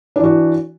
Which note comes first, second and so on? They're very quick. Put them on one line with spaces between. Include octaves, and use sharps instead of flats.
D4 E3 F#4